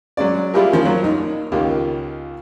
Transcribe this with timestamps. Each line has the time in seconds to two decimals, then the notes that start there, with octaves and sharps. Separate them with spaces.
0.17 F#3 G#3 C#4 D5
0.54 G3 E4 F4 G4 G#4 A#4
0.72 D#3 F3 C#4
0.84 F#3 F4
1.04 A#1 D#4
1.52 C#2 D#3 F4 G4